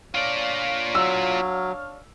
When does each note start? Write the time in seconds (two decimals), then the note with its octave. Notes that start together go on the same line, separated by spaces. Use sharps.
0.15 D4 F4 C#5 D5 F5
0.95 F#3 E6